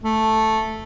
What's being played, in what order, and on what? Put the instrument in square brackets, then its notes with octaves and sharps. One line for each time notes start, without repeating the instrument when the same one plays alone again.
[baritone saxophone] A3